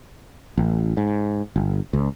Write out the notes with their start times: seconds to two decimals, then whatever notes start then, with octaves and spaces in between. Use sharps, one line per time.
0.57 A1
0.97 G#2
1.56 G1
1.93 C#2